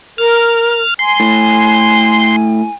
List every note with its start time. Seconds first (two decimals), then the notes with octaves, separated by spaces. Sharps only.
0.18 A#4 F6
0.99 G#5 C6
1.20 A2